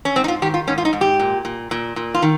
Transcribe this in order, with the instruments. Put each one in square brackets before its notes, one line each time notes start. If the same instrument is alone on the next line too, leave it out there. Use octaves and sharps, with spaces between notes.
[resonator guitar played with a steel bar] C#4
G#2 C4
D#4
F4
D#3 G4
F4
G#2 C#4
F4
D#4
G#2
G4
A#2
A#2
A#2
A#2
F4
D#3